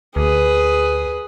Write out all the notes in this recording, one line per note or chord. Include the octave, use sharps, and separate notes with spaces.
D2 G#4 B4